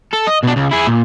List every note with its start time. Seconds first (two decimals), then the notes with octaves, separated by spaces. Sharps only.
0.13 A4
0.27 D#5
0.44 B2 D4
0.57 C#2
0.71 E4 G#4
0.87 A#2